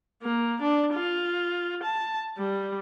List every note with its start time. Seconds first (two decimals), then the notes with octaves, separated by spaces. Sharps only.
0.23 A#3
0.62 D4
0.94 F4
1.83 A5
2.38 G3